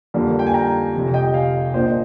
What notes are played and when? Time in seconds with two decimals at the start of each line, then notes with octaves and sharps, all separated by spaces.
0.14 F2 D3 G3 A#3
0.39 G5
0.47 G#5
0.54 G5 A#5
0.94 F1 F2 C3
1.14 D#5 G5
1.34 F5 G#5
1.74 A#1 A#2 F3 A#3 D4 C5 D#5